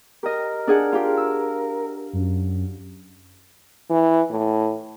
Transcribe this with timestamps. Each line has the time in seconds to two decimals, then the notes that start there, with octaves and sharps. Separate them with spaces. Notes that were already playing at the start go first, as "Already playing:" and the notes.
0.23 G4 A#4 D#5
0.67 D4 G#4 F#5
0.93 F4 G4
1.17 E6
2.13 F#2
3.90 E3
4.30 A2